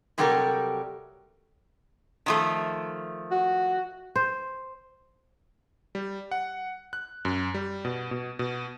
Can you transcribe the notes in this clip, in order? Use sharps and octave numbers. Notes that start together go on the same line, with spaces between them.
C3 F#3 G3 G4 A4 A#4
D#3 F3 A3
F#4
C5
G3
F#5
F#6
F#2
G3
B2
B2
B2